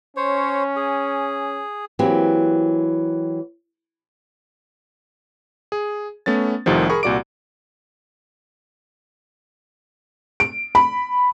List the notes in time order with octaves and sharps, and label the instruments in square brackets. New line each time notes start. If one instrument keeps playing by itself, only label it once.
[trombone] C#4 [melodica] C5 C#5
[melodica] G#4
[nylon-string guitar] E3 F#3 A#3 C4 G4
[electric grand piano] G#4
A3 B3 C#4 A6
C2 A2 C3 D#3 F3
G#4 A#4 B5 C#6
C2 A#2 F#4 D5 D6 D7
[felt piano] D7
B5